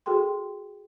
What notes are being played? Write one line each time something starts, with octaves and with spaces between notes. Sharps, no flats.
F#4 G#4 A4 G5 C6